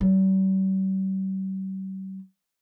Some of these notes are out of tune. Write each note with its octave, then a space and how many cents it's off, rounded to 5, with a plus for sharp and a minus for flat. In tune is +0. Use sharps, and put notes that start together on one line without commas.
G3 -45